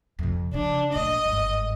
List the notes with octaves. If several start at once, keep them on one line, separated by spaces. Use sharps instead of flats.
F2 C3
C#3 F3 D4
A#1 G#3 D#5
G1 G#2